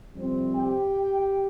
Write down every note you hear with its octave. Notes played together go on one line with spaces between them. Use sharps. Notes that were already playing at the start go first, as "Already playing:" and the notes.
F2 C3 G3 C4
G4 G5